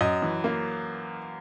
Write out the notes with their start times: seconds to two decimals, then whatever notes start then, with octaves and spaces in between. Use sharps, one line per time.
0.01 F#2 D#5
0.22 E3
0.44 A#3